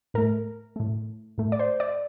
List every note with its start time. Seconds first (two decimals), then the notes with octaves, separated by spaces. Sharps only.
0.14 A2 A3 A#4
0.76 A2 A3
1.38 A2 A3
1.52 D5
1.59 C5
1.80 D5